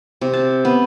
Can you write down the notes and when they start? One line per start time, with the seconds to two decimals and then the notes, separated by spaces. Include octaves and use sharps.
0.21 C3
0.33 A5
0.65 B3